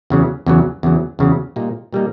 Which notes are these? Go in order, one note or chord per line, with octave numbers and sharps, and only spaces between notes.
E2 C#3 F#3
E2 C#3 F#3
E2 C#3 F#3
E2 C#3 F#3
A#2 G3 A#3 D#4
A#2 G3 A#3 D#4